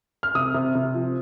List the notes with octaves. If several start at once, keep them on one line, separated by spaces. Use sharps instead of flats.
F6
C3 D#6
C3
C3
F3